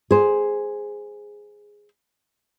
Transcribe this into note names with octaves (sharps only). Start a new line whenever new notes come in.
G#4 C5